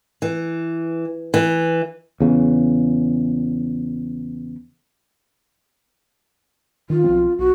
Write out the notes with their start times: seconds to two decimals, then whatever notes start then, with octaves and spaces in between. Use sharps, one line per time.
0.22 E3
1.34 E3
2.20 E2 C#3
6.90 D#3 F4
7.04 B1 F3 C4
7.39 B1 F#4